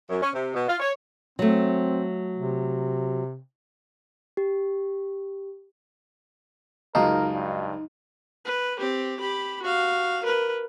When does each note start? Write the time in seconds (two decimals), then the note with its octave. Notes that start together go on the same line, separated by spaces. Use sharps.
0.10 F#2
0.22 C#4
0.34 C3
0.54 B2
0.69 F4
0.80 C#5
1.39 F#3 A3 C4
2.36 C3
4.37 G4
6.95 C#2 F#2 G#3 D#4 F#4 A#4 F5 A5
7.33 G2
8.45 B4
8.79 C4 G4
9.20 G4 B5
9.62 F#4 F5
10.23 A#4 B4